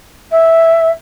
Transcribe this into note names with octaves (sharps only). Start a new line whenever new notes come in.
E5